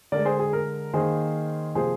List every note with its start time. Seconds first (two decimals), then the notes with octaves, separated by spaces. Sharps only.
0.12 D3 G#3 A#4 D5
0.25 G#4 C5
0.39 G#4
0.53 A#4
0.94 D#3 A#3 G#4 C5
1.75 C3 F3 A#3 G#4 C5